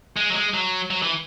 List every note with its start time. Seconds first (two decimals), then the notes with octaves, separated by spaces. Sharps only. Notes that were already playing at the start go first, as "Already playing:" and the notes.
0.16 G#3
0.30 F#3
0.34 G#3
0.54 F#3
0.91 F#3
1.02 E3